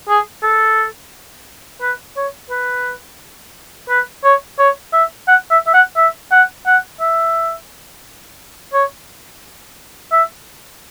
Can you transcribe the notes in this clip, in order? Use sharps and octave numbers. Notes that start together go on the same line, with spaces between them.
G#4
A4
B4
C#5
B4
B4
C#5
C#5
E5
F#5
E5
E5
F#5
E5
F#5
F#5
E5
C#5
E5